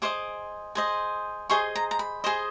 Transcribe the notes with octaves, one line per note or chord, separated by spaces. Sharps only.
G#4 C5 D#5 D6
G#4 C5 D#5
G#4 C5 D#5 C#6
A#5
A#5
B5
G#4 C5 D#5